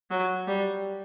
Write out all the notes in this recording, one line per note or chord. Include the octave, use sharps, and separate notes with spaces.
F#3
G3